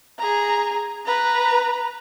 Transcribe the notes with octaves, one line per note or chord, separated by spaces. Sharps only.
G#4 A#5
B4 A#5